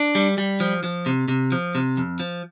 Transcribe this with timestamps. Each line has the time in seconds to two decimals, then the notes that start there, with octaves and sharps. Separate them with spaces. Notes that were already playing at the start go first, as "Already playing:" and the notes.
Already playing: D4
0.15 G3
0.38 G3
0.60 F3
0.84 F3
1.06 C3
1.28 C3
1.52 F3
1.75 C3
1.97 F2
2.20 F3